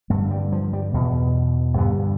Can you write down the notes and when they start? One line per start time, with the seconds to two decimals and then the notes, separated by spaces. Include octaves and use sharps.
0.10 G2 D3 A3
0.31 G3
0.52 F3
0.73 G3
0.94 E2 B2
1.77 G2 D3 B3